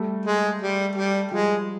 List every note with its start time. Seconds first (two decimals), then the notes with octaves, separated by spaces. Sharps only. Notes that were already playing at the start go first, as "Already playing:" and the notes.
Already playing: G3 A3
0.25 G#3
0.61 G3
0.96 G3
1.31 F3 G3 G#3